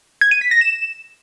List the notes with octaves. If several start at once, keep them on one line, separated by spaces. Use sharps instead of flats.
G#6
D#7
B6
A#6
E7